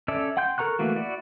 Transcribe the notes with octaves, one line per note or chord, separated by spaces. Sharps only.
C#4 A4 D5 E5
F#5 G5 C6 G6
A4 A#4 A#5 C#6 F#6
E3 A3 A#3 F#4
E4 F#4 D5